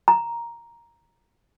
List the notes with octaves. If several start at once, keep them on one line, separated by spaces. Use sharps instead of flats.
A#5